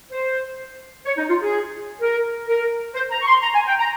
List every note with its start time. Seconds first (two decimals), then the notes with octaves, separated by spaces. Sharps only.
0.11 C5
1.05 C#5
1.17 D#4
1.29 F4
1.41 G#4
2.01 A#4
2.48 A#4
2.95 C5
3.11 A#5
3.22 C#6
3.27 C6
3.42 A#5
3.54 G#5
3.67 G5
3.79 A#5